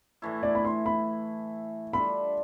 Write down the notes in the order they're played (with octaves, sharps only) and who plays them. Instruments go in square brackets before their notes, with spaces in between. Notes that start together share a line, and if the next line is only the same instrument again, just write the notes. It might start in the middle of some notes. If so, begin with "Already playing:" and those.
[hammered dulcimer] A2 E3 A3 E4
[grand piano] D5
B5
C6
B5
[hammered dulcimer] G3 D4 F4 A4 [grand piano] B5